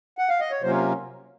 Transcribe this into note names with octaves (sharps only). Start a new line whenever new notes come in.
F#5
F5
D#5
C#5
C3 F#3 A#3 C#4 F4 C5